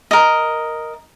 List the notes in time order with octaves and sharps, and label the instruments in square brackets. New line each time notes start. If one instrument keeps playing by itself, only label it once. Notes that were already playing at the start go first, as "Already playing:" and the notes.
[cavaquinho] A#4 D#5